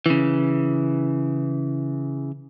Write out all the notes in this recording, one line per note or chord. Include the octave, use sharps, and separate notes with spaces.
C#3 E3